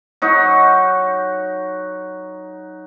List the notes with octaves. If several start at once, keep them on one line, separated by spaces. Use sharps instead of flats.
F#3 D#4 F#4